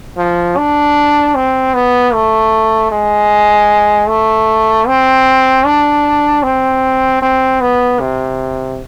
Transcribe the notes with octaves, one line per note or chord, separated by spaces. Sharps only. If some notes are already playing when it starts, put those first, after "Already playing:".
F3
D4
C4
B3
A3
G#3
A3
C4
D4
C4
C4
B3
C3